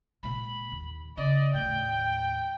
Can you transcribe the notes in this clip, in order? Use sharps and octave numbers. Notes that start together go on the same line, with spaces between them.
A#2 G#3 B5
D#2
C#3 D5 D#5
D#2 A2 G5 G6